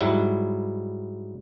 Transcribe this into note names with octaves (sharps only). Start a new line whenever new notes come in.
G#2 F#3 G3 E4